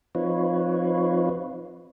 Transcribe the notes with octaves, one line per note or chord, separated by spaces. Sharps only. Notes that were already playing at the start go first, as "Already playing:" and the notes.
F3 C4 D#4 F4 B4 C#5